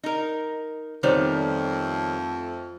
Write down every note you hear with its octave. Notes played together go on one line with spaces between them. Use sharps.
D#4 A#4
F2 D#3 G3 A3 B3 C5 C#5